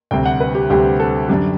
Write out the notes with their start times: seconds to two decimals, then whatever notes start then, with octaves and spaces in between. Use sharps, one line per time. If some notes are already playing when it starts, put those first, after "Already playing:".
0.11 D2 C3 G3 C4 G5
0.26 F#5
0.40 B4
0.55 G4
0.70 D2 C3 G3 C4 G4
1.00 A4
1.29 F#2 D3 G3 D4 G4